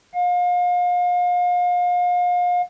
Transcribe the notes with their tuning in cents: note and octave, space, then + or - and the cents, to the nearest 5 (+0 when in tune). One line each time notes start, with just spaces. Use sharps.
F5 +35